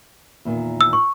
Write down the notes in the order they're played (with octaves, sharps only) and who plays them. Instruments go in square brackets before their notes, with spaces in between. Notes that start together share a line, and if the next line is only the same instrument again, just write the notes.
[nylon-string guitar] E2 A#2 D#3
[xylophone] E6
[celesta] C#6